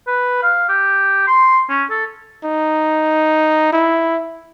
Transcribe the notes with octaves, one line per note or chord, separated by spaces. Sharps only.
B4
F5
G4
C6
C#4
A4
D#4
E4